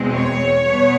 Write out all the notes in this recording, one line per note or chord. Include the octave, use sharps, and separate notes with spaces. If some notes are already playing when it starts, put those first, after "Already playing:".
Already playing: E2 B2 G#3 C4
C#5
B2 G3 B3